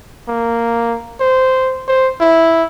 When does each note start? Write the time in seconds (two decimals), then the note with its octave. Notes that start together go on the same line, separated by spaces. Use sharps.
0.28 A#3
1.20 C5
1.88 C5
2.21 E4